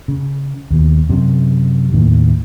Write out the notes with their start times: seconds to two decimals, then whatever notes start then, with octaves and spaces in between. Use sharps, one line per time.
0.08 C#3
0.70 D#2 B2
1.09 F#2 C3
1.93 D#2 A2 D#3